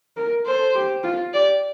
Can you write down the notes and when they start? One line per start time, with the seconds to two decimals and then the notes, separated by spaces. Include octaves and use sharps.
0.17 A#4
0.46 A4 C5
0.75 G4
1.04 F4
1.34 G4 D5